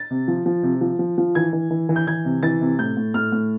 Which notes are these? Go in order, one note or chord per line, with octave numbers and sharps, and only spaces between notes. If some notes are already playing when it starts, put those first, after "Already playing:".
Already playing: A6
C3
F3
F3
C3
F3
F3
F3
E3 G#6
E3
E3
E3
G6
E3 G#6
C3
E3 A6
C3
A2 G6
A2
A2 F6
A2